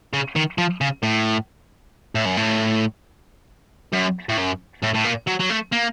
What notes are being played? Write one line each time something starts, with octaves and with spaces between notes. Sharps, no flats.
C#3
D#3
F3
C#3
A2
A2
F#2
A2
F#2
A2
F#2
A2
A2
A#2
F#3
F#3
A3
A#3